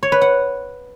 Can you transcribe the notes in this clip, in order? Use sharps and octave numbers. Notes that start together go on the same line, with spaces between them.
C#5
B4
F#5